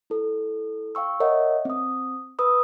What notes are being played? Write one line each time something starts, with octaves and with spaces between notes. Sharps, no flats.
E4 A4
F5 G5 C#6 E6
A#4 C#5 D#5 E5 F#5
C4 D#6
B4 B5 D#6 E6